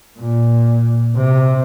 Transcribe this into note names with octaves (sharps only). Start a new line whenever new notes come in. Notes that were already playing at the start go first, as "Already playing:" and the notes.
A#2
C3